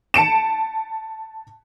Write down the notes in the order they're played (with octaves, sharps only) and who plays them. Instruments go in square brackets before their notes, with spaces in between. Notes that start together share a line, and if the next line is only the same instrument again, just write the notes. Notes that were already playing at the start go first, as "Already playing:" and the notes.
[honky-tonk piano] A5 C#7 D7 E7